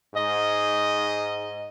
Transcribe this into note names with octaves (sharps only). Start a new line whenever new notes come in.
G#2 D#5